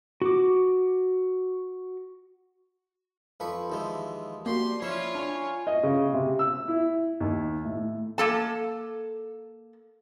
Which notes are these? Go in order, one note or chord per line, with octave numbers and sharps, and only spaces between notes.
F#4 D6
F2 F3 B4 C#6
D#2 E3 G#3
A#3 F#4 G4 D5 C6
F3 C#4 E4 F4 C#5 C#6 E7
D4 G#5 C#6
D#5
C#3
C3
E6
E4
D#2
A2
A#3 A4 A5